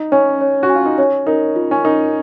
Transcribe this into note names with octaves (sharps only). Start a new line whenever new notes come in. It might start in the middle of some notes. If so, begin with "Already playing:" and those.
Already playing: D#4
C#4 C#5
C#5
F#4
G#5
F4
D#4
C#4 C#5
D#4 A#4
F4
C#4
D#4 A#4